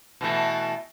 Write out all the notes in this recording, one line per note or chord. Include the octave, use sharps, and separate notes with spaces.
B2 E3 A3